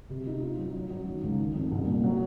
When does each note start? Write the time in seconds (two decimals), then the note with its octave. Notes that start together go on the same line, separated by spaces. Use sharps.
0.09 C3
0.26 D#4
0.42 F4
0.58 F#3
0.74 F#3
0.90 F#3
1.07 D#3
1.23 C#2
1.38 D#3
1.55 F2
1.71 C2
1.87 A#2
2.03 F#3